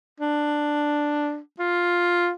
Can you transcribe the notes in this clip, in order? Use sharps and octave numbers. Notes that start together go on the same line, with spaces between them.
D4
F4